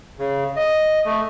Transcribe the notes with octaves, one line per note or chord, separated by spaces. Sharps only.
C#3
D#5
A3